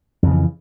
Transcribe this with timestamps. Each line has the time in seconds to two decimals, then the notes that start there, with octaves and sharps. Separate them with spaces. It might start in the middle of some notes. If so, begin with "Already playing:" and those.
0.23 F2
0.27 C#3
0.31 E3